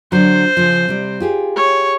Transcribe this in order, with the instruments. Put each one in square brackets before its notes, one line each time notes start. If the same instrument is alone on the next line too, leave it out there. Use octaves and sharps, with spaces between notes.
[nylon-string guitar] D3 F#3 [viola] C5
[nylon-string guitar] C#3 F3
C3 G3
F4 G4 G#4
[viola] C#5